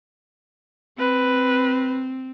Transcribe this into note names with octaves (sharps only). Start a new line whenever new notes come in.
C4 B4